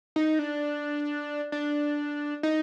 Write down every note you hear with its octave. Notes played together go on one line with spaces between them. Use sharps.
D#4
D4
D4
D#4